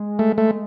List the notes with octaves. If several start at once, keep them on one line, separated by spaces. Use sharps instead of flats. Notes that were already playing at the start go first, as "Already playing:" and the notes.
Already playing: G#3
A3
A3